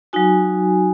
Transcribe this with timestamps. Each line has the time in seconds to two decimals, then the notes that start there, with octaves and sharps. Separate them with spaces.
0.13 F#3 D#4 F#4 G#5